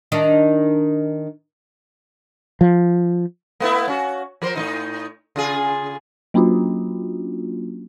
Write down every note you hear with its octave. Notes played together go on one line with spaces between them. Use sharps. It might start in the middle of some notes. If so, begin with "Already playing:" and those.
D#3 D4 D#4
F3
A3 B3 E4
C#4 F#4
F3 A#4 C5
A2 E3 D#4
C#3 F4 G#4
F#3 A#3 C#4 D4 F4 F#4